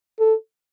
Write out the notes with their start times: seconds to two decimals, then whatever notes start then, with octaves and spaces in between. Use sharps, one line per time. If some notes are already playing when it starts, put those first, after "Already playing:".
0.20 A4